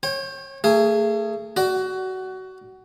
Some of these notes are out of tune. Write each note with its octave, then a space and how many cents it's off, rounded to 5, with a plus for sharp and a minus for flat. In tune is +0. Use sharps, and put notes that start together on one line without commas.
C#5 -30 G5 +15
A3 +35 G#4 +0
F#4 +20 D5 +0